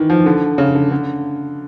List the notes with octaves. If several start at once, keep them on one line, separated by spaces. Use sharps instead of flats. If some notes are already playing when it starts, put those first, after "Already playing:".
Already playing: D#3 E3
F3
D3
C#3
D3
D3